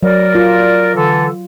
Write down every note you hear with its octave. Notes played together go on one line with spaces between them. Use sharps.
F#3 A#4 D5
F4
D3 E3 A4